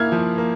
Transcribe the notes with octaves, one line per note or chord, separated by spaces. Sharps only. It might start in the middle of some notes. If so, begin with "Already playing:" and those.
Already playing: A#3 E4 F6 G#6
F3
A#3